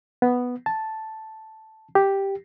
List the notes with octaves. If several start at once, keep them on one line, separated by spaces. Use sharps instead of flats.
B3
A5
G4